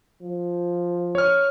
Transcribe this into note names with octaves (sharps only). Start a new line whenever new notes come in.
F3
C#5 F6